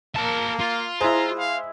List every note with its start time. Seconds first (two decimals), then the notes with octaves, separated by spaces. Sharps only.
0.16 A#3 A#4 A5
0.60 F4
1.01 G#3 E4 C5 A#5
1.38 F5